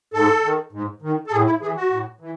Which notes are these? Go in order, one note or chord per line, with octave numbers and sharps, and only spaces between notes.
G#2 A4
D#3
G#2
D#3
A4
A2 G#4
E4
E3 G#4
F#4
A2
E3